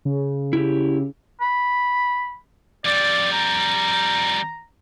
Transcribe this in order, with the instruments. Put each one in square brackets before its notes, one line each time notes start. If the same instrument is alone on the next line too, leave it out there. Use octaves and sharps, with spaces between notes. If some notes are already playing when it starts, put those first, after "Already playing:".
[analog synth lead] C#3
[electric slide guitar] E4 G4
[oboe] B5
[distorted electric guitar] F2 G3 [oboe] D5
[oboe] A#5